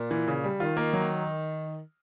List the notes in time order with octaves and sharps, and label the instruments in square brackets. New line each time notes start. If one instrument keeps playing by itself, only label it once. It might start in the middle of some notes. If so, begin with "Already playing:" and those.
Already playing: [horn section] A#2
[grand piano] E3
C#3
G3
[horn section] D#3 [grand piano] F4
[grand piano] A#3
F#3